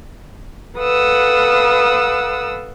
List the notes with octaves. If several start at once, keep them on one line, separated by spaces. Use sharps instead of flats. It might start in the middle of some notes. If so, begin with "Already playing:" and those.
A4 B4 F5 F#5 D#6 E6